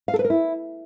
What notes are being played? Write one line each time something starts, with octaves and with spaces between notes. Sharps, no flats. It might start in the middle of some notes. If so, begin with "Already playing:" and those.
F5
A4
B4
A#4
E4